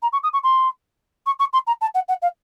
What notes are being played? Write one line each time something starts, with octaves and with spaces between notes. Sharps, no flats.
A#5
C#6
D#6
C#6
C6
C#6
C#6
C6
A#5
A5
F#5
F#5
F5